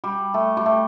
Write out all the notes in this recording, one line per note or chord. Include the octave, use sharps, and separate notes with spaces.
G3
A3
G3
A3